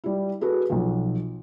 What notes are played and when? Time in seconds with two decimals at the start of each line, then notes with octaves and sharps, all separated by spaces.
0.04 G3 E4
0.41 F#4 G#4 A4 B4
0.70 B1 F3